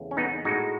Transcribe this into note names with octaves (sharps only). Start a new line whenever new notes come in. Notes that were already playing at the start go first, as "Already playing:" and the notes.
Already playing: E2 C#3 E3 A3
C#4
B3 D#4
A2 G#3 D#4 F#4